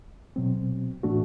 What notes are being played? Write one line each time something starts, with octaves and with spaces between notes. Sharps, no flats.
B2 F#3 C4
A2 E3 A3 D4 F#4